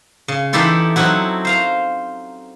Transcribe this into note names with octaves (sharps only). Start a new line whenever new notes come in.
C#3
E3 D#4 E4 G4 A4 C6
F#3 C4 D#4 E4 F#4
C5 F5 A#5